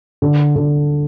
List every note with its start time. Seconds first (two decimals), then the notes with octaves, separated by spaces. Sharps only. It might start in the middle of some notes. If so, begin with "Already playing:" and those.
0.22 D3
0.56 D3